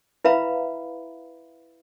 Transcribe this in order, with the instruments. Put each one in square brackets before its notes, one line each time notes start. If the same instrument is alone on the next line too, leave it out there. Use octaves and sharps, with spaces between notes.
[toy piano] E4 B4 E5 F5 A#5 B5